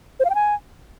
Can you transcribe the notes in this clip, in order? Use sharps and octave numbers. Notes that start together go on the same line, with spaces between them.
C5
F5
G5
G#5